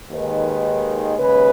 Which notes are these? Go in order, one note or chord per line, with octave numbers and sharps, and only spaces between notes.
D#2 D#3 G#3 B4
D#2 C#3 G#3 B4